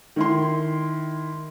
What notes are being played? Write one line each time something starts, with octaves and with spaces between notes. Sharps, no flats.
D#3 E4 C6